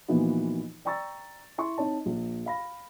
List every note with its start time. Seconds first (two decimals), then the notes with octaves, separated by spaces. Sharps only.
0.08 A#2 E3 F3 B3 D#4 F#4
0.85 D5 G5 A#5 C#6 E6 A6
1.58 E4 C6 C#6
1.78 C4 D#4 C#5 A5
2.06 A#1
2.46 F5 B5 A#6